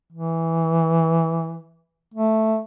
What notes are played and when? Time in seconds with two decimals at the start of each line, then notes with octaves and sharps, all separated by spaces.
0.13 E3
2.14 A3